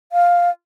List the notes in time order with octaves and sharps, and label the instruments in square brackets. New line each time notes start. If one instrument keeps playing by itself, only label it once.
[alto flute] F5